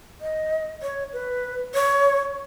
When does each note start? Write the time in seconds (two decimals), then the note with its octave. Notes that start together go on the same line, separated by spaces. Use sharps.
0.21 D#5
0.82 C#5
1.13 B4
1.74 C#5